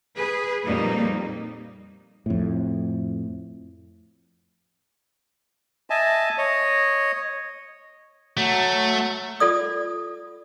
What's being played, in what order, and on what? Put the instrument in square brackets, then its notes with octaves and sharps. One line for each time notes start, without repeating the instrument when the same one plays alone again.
[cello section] G#4 B4
F2 A#2 F#3 G3 A#3 D#4
[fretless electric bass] F2 A2
[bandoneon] D#5 E5 G#5 A5
C#5 D#5
[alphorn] F#3 [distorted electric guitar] A3
[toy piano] F4 A4 D5 D#6